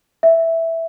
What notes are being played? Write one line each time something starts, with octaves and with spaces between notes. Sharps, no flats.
E5